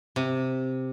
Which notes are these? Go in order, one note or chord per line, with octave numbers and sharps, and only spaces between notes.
C3